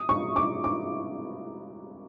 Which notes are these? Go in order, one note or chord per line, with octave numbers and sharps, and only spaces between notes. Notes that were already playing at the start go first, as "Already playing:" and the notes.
Already playing: D#6
C#6
D6
D6